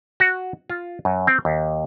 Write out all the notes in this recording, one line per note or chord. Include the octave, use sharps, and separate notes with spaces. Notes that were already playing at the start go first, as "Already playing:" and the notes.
F#4
F4
F#2
C4
D#2